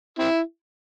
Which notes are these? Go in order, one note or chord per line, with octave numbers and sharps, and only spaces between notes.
C4 E4